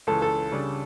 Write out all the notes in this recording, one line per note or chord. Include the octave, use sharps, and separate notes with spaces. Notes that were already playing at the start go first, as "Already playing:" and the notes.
C#2 C#3 E3 A4
A4
C#3 G3 D4